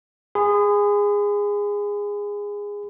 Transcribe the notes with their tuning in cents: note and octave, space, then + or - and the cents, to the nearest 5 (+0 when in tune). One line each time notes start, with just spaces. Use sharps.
G#4 -15 B5 +45